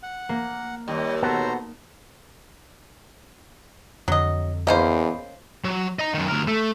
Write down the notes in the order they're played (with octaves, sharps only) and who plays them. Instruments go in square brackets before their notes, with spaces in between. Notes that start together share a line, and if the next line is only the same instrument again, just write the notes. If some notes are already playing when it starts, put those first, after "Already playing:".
[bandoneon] F#5
[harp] A#3
[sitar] D#2 [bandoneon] G3 D#5
[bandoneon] B2 C5 A#5 [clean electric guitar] B3 F#4 A4
[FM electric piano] F2 D3 [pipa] F#3 D#5
[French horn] E2 [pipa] A#3 C#4 C5 [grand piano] D#5 B5
[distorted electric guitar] F#3
D#5 A#5
F#2 D#3
D2 A#4
A3